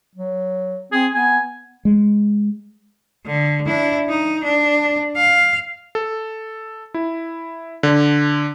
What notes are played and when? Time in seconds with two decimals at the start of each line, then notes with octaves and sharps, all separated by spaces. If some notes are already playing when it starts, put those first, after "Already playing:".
0.15 F#3
0.92 C4 G#4
1.14 B3 G#5
1.85 G#3
3.26 D3
3.66 D4 E4
4.09 D#4
4.44 D4
5.16 F5
5.95 A4
6.94 E4
7.83 D3